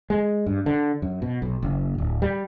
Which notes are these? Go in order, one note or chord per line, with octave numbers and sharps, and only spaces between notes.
G#3
G2
D3
F#2
B2
B1
F#1
D1
G3